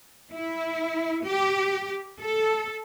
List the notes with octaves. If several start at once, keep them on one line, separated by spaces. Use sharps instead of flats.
E4
G4
A4